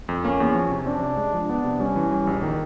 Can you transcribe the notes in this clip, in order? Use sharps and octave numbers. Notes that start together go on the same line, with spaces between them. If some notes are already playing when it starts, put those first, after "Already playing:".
F2
A#3 C#4
E2
F3
C3
C4 D4
C3
G#3
F3
B3 D4
C3
G3 C#4
E3
G3
A#1
D#3